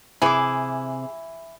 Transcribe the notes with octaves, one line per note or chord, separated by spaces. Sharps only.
C3 E3 E4 G#4 D6